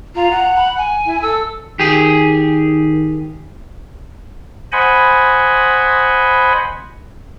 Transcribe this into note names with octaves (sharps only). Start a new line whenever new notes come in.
F4 A#5
F#5
B5
G#5
E4
A4 E6
D#3 G4 G#4
C5 D#5 F#5 G#5 B5